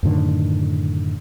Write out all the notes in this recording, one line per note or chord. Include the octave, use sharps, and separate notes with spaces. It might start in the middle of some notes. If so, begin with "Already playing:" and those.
F#2 A2 D3 D#3